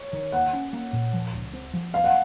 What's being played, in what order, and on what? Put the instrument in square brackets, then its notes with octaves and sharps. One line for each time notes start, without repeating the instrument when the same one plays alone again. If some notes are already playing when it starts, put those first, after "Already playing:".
Already playing: [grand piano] C#5
[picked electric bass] D#3
[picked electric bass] A#3 [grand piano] F#5
[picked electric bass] C#4
A#3
A#2
F3
C#2
C4
F3
[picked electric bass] C4 [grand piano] F5
[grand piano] F#5